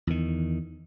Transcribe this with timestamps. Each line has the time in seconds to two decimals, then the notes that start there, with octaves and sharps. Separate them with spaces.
0.07 E2 D#3